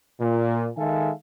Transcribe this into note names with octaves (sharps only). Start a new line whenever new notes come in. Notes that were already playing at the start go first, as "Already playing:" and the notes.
A#2
D#3 G#3 A4 E5 F5 G#5